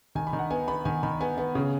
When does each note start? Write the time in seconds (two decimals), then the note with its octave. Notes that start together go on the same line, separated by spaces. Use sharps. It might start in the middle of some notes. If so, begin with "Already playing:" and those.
0.15 D#3 G#5
0.27 B5
0.33 D#3
0.39 F#5
0.51 B3 G#5
0.68 B3 B5
0.85 D#3 G#5
1.03 D#3 B5
1.21 B3 G#5
1.38 B3
1.55 C#3